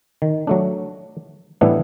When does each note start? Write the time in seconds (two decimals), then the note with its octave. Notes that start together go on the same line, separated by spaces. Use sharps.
0.22 D#3
0.47 F#3 A3 D4
1.61 A2 E3 G3 B3 D4 E4